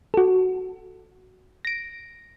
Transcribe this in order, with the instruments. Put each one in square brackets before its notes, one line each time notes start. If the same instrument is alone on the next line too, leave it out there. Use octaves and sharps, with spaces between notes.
[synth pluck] F#4 A4
A#6 D7